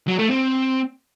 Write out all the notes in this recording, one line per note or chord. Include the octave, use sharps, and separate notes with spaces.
F#3
A3
C4